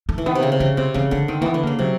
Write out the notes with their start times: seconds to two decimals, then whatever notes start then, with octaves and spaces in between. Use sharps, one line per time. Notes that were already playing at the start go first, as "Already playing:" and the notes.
0.09 A3
0.18 E3
0.26 D#3 B3
0.35 C3
0.43 C#3
0.52 C3
0.60 C#3 C#4
0.77 C3 C4
0.94 C#3 C4
1.11 D3 C#4
1.28 D#3 C4
1.41 E3 A#3 B3
1.54 D3
1.63 C#3 A#3
1.79 C3 F#3